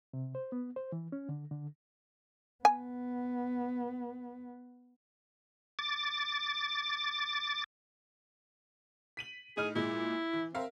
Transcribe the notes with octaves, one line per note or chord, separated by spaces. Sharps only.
C3
C5
B3
C5
E3
C#4
D3
D3
B3 G#5
D6 A6
B6 D#7 F#7
A2 D#4 G#4 F6
A#2 G#3 E4
E3
C4 A#4 E5 F5